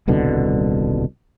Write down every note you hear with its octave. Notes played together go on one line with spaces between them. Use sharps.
D#1 C2 B2 D3